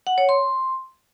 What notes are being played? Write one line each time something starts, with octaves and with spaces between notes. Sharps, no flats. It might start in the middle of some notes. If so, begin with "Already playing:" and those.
F#5
C#5
C6